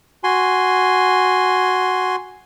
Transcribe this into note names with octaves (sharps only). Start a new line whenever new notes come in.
F#4 G#5 C6